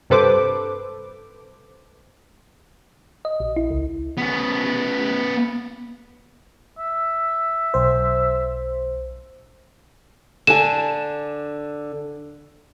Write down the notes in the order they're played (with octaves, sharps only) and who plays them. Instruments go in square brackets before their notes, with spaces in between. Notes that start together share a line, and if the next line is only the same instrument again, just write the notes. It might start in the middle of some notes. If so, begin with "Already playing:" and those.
[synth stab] G2 C3 A4 B4 C5 D6
[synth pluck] D#5
A#1
E4
C#2
[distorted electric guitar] B3 C#4
[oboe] E5
[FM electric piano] B1 C5
[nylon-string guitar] D3 D4 G#5 [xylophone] E7